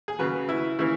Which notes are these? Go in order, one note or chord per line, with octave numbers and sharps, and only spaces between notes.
G#4
C#3 F#3 B4
E4
C#3 E3 E4